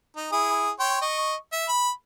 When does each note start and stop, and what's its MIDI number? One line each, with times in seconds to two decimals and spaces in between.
0.17 0.28 63
0.32 0.71 64
0.32 0.71 68
0.32 0.71 87
0.80 1.01 73
0.80 1.01 79
0.80 1.01 84
1.02 1.35 75
1.02 1.35 85
1.52 1.67 76
1.69 1.90 83